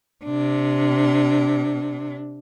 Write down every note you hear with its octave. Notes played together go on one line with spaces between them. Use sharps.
C3 D4